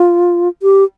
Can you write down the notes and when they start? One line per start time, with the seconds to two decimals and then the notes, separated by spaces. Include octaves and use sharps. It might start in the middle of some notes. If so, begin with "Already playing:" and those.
Already playing: F4
0.63 G4